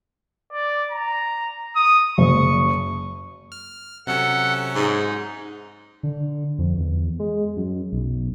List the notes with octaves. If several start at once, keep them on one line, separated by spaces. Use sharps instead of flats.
D5
A#5
D#6
F#1 C#6
F6
C3 F#3 C#4 A4 F#5 F#6
G#2 D#4
D3
F2
E2
G#3
F#2
B1